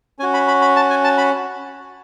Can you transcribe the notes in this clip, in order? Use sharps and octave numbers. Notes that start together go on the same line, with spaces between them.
C#4 F#4 G#5
B5
B5
B5
A5
G#5
A5
B5